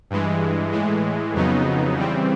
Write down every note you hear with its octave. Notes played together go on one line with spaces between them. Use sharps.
G2 E3 G#3
A2 E3 G#3
F2 C#3 F#3 B3 D#4
C#3 E3 G3 C4